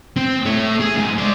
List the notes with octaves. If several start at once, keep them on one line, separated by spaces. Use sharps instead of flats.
C4
A3 C#5
G#4
C#2 G#2
C5 D5